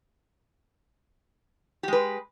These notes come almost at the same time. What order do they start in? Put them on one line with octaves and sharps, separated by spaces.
G4 G#3 B4